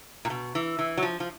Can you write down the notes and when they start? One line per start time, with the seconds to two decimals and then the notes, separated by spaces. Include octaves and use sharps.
0.25 A#2
0.30 B2
0.55 E3
0.79 E3
0.97 F#3
1.03 F3
1.20 F3